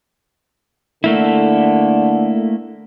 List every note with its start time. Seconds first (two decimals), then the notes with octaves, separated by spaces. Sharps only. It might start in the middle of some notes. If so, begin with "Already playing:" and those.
1.04 D3 A3 A#3 E4